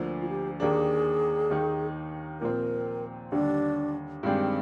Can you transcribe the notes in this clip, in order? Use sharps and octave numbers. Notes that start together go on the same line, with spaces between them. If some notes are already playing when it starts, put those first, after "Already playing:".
Already playing: D2 D3 F3 A#3 D4
F4
G4
D#2 D#3 A#3 D4 G#4
D#2 D#3 A#3 D#4
A#2 F3 C4 A#4
D#2 D3 G3 D4
G2 D#3 G#3 C4 D4 G4